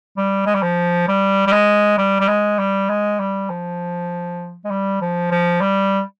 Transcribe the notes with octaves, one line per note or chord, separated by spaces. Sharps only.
G3
G#3
G3
F3
G3
G3
G#3
G3
G3
G#3
G3
G#3
G3
F3
G#3
G3
F3
F3
G3